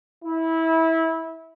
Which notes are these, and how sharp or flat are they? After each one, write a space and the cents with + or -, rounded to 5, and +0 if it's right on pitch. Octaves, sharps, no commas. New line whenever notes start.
E4 -20